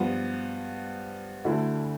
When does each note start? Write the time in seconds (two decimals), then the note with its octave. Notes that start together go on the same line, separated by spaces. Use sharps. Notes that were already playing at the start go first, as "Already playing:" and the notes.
Already playing: G2 F3 B3 F4
1.44 D2 D3 A3 E4